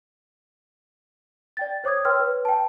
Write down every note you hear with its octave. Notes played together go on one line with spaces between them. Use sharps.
D5 G5 A6
C5 C#5 D6 D#6 G#6
B4 C#5 G5 C6 E6 F6
B4
G5 A5